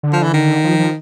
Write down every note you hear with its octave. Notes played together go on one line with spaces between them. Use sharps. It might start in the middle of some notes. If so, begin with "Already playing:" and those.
D3
F3
E3
D#3
F3
F3